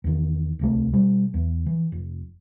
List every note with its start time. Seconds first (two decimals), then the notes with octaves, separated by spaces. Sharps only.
0.04 E2 D#3
0.59 D1 C2 A3
0.93 B2 G3
1.34 E2
1.66 E3
1.92 F1